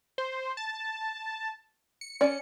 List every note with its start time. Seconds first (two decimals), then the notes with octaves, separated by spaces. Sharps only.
0.18 C5
0.57 A5
2.01 C#7
2.21 C#4 D5